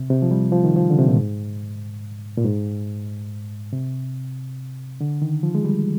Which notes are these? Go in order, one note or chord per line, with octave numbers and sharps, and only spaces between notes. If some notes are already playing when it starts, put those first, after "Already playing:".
Already playing: C3
C3
F3
G3
F3
D#3
F3
D3
C3
A#2
G#2
A#2
G#2
C3
D3
D#3
F3
G#3
G3